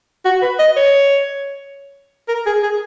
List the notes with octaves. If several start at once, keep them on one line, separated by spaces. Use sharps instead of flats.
F#4
B4
D#5
C#5
A#4
G#4
G#4